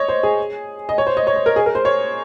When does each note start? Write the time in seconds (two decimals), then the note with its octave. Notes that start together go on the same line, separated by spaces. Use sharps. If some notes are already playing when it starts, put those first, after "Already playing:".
Already playing: C#5 D#5
0.08 C5
0.23 G#4
0.89 D#5
0.98 C#5
1.07 C5
1.17 D#5
1.27 C#5
1.36 C5
1.46 A#4
1.56 G#4
1.66 A#4
1.75 C5
1.85 C#5